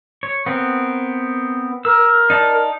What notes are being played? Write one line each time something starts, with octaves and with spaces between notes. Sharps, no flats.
C#5
B3 C4 A#4
A#4 E6
D#4 D5 A5